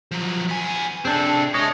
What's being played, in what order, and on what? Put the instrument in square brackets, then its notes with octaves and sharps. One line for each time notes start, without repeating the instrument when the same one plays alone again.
[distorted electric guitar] F3 F#3
B3 G#5
[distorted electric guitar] C3 G#4 [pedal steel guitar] C4 D4 A4
[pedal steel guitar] G#3 C#5 D#5 [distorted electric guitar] A4 E5